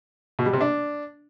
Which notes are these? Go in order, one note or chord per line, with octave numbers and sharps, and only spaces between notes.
B2
G3
C3
D4